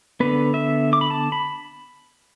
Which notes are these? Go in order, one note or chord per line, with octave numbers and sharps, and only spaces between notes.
D3 B3 B4
E5
D6
B5
A5
B5